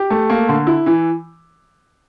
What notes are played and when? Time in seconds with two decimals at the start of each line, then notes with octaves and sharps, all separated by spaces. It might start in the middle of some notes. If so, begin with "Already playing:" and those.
Already playing: G4
0.10 A3
0.30 A#3
0.49 D3
0.67 E4
0.86 E3